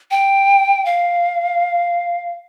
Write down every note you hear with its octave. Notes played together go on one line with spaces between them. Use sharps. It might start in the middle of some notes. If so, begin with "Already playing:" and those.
G5
F5